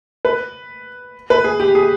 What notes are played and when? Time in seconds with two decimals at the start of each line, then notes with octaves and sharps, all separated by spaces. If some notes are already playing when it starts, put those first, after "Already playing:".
0.25 B4
1.30 B4
1.44 G#4
1.60 G4
1.75 G#4